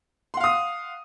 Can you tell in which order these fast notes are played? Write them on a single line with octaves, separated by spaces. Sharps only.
C6 F#5 F5 D#6